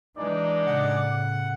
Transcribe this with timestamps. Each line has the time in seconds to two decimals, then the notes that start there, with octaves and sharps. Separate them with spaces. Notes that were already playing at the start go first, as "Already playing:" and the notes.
0.17 E3 G#3 D4 D#4 D5
0.66 A2 C#3 F#5